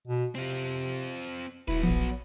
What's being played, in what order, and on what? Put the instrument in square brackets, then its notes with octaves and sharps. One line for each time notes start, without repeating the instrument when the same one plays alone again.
[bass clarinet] B2
[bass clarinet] C3 [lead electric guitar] C4 F4
[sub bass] D#1 [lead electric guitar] F#3 B4 [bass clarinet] E4
[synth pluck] A#1 F3 [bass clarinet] B3